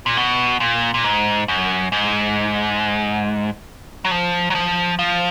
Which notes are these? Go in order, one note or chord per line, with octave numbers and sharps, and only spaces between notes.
A#2
B2
A#2
A#2
G#2
F#2
G#2
F#3
F3
F#3
F3
F3